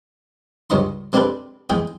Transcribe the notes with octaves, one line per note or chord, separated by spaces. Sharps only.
C#2 G2 C#4 D#5 C6
G#3 C4 D4 G4 A4 B4
E2 G#3 G#4 G5